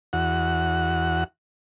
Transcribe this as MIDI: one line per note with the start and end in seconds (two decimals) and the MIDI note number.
0.13 1.24 40
0.13 1.24 66
0.13 1.24 78